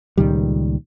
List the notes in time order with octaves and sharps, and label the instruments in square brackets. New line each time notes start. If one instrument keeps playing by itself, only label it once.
[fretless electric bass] C#2 A#2 D#3 G3